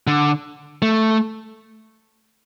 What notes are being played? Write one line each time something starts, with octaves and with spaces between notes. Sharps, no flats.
D3
A3